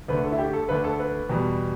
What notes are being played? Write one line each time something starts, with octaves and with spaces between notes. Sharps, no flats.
D2 D3 A3 B4
A4
E4
G4
A4
D2 D3 A3 B4
A4
B4
E2 B2 G3